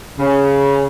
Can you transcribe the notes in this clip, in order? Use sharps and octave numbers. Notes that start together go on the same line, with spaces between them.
C#3